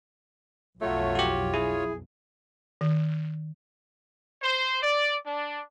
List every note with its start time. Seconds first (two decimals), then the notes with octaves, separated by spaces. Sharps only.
0.82 B1 F2 F#3 A3 F4 C#5
1.15 F#4 G4
1.54 E4 G#4
2.81 D#3
4.41 C5
4.81 D5
5.24 D4